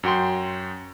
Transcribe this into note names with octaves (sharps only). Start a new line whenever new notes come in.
F#2 F#4 G5 C6